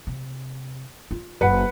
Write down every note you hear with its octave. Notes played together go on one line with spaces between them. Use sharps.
C3
F4
F#1 B4 F#5